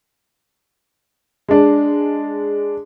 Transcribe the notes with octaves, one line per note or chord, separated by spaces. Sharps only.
G#3 D4